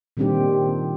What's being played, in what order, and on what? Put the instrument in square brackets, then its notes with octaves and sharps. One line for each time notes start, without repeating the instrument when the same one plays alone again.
[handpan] A#2 D#3 G3 C4 D4 G4